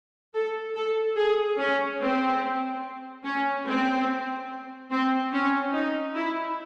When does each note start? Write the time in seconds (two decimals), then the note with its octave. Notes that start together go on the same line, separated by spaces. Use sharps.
0.35 A4
0.76 A4
1.17 G#4
1.58 C#4
2.01 C4
3.25 C#4
3.67 C4
4.92 C4
5.33 C#4
5.74 D#4
6.15 E4